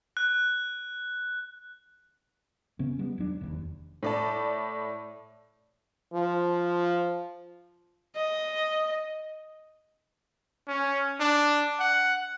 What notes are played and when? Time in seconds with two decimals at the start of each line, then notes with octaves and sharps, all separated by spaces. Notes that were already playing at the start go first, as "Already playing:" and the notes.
0.17 F#6
2.79 C#3 B3 C#4
2.99 G3 G#3 B3
3.18 E1 F#3 D4
3.41 F1 D#2
4.03 A2 D5 A5
6.14 F3
8.15 D#5
10.67 C#4
11.20 D4
11.80 F#5